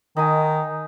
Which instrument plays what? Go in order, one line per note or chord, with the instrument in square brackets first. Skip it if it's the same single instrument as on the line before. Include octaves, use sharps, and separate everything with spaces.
[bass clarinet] D#3 [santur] D#4 G#5